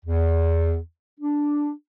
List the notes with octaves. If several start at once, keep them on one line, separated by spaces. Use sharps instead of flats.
E2
D4